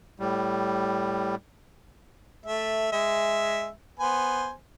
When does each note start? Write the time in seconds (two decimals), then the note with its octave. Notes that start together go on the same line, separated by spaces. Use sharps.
0.19 A2 G3
2.46 A3 E5
2.92 G#3 E5
4.00 B3 C5 G#5